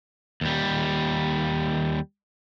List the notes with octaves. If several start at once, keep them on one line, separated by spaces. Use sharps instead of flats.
D#2 G3